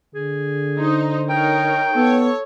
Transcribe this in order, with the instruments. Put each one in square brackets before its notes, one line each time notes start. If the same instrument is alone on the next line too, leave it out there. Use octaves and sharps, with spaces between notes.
[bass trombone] D3 [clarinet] G#4
[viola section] D#4 C5
[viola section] D#4 A#4 C#5 [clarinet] G5
[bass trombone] B3 [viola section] A4 C#5